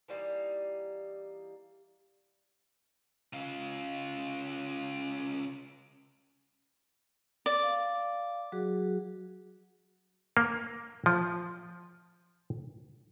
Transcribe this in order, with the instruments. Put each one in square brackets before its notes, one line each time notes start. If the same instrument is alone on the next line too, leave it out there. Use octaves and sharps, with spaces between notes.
[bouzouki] E3 G3 A#3 D#4
[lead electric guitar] C#3 F4
[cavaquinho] D5
[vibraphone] F5
F#3 F#4 G#4
[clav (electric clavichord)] A#3
F3